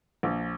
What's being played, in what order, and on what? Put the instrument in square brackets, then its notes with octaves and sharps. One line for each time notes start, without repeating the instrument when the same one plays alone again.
[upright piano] A#1